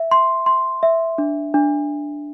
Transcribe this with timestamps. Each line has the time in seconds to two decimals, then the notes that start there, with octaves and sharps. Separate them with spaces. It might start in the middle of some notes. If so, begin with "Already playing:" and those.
Already playing: E5
0.11 C6
0.46 C6
0.83 E5
1.18 D4
1.54 D4